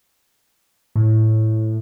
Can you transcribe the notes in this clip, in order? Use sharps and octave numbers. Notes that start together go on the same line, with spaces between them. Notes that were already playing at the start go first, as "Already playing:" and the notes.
A2